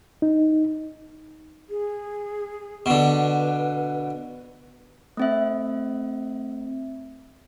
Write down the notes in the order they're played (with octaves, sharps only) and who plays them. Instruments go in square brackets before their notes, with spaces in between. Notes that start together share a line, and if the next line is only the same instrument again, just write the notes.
[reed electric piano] D#4
[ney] G#4
[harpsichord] B2 D3 [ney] B4
[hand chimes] A3 C4 E5